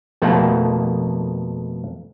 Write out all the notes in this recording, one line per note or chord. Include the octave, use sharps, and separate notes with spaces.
F2 B2 A3 A#3 F#5 G5